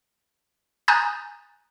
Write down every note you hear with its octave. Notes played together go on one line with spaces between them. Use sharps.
G#5 A#5 D#6 F#6 G6 A6